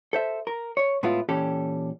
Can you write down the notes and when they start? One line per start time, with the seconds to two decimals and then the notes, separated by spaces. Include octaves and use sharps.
0.13 A4 C5 E5
0.47 A#4
0.77 C#5
1.03 A2 G#3 B3 E4 F4
1.29 A#2 E3 C#4 G4 A4